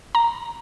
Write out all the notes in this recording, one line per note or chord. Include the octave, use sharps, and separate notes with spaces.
A#5